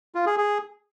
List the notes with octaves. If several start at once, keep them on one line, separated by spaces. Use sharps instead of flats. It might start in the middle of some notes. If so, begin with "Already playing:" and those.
F4
G#4
G#4